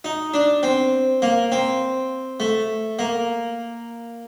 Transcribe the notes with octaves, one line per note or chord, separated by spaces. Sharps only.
D#4
D4
C4
A#3
C4
A3
A#3